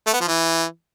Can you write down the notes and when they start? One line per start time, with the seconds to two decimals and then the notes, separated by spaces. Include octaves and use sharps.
0.07 A3
0.14 B3
0.21 F3
0.28 E3